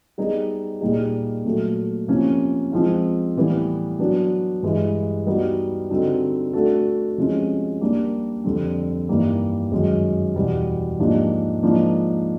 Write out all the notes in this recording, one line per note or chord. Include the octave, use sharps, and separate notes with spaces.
G3 B3 D#4 G#4
A#2 G3 A#3 D#4 G#4
A#2 F#3 A3
C3 F3 A#3 C#4
F3 G#3 C4 F4
A2 E3 G3 B3 E4
F#3 B3 D4 F#4
G2 E3 G#3
G3 B3 D#4 F#4
D3 G3 C4 D#4 F#4
A3 D4 F#4 A4
C3 F3 G#3 C#4
G3 A#3 D4
F2 D3 G3 C4
G2 E3 G3 A#3 D#4
F#2 D#3 G#3
E2 B2 G3
G#2 F3 A#3 D4 G4
G#2 F3 A#3 D4